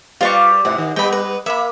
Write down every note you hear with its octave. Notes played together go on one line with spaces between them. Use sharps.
G3 F4 B4 D5 F5 C#6
G#2 C3 F#5
D#3
G3 B3 G5 B5
B4
A#3 E5 B5